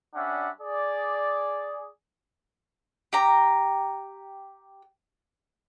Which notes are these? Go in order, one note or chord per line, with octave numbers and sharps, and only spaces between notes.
G3 C#4 D4 E5 F#5
G#4 D5
G4 A#5